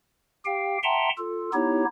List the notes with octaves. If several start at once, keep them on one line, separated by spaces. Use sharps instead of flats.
G4 F5 G5
E5 F#5 G5 A5 A#5 C6
F4 A4
B3 D#4 E4 G4 C#5